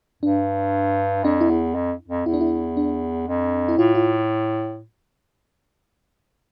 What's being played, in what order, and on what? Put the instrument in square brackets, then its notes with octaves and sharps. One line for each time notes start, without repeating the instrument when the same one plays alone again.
[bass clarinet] G2 [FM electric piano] D4
[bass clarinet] F2 [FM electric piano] D4
[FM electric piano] E4
[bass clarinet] E2
F2
F2
[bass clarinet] E2 [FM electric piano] E4
[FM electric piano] D4
E4
D4
[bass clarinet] F2
[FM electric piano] E4
[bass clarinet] A2 [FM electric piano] F4
[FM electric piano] F4